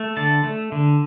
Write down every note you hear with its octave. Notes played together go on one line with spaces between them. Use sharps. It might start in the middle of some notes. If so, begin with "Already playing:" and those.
Already playing: A3
D3 A5
A3
D3